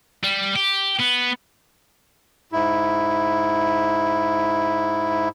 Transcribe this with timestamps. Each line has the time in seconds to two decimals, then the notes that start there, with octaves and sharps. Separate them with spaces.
0.24 G3
0.56 G4
0.99 B3
2.52 G#2 E4